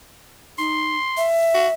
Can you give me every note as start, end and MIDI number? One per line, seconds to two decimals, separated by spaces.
0.58 0.96 63
0.58 1.24 84
1.17 1.73 76
1.54 1.68 66